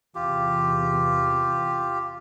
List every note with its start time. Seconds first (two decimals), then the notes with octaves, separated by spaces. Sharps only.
0.15 E2 C3 F4 G4